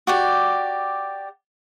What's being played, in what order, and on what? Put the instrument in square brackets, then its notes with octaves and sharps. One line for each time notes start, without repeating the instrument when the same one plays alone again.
[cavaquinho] F#4 G4 D5